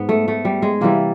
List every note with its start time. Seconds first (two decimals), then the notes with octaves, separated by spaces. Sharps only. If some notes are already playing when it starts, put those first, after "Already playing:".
Already playing: G#2 B3
0.09 A3
0.28 A3
0.45 G3
0.62 G#3
0.81 C3 E3 G3 A#3